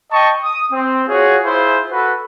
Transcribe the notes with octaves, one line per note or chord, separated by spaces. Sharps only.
D#5 G5 A5 C#6
D#6
C4
F4 F#4 G#4 C#5
E4 F4 G#4 C5
F#4 A4 B4